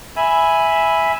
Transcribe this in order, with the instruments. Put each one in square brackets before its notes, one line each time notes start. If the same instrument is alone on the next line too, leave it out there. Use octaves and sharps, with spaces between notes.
[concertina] E5 G#5 B5